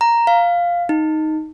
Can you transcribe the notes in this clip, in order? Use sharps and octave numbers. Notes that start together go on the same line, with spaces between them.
A#5
F5
D#4